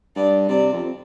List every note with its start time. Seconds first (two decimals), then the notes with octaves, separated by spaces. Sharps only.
0.16 G2 D5
0.49 C3 D5
0.73 F2